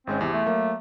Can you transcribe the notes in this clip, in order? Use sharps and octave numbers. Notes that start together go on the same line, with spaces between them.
G#1 G#3 C4 C#4
E2 C3
A3
F#3 A#3